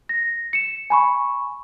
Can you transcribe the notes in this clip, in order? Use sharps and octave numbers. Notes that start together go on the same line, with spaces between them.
A#6
C#7 E7
G#5 B5 C#6